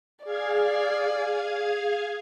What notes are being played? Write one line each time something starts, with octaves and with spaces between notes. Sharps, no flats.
G#4 D5 F5 G#6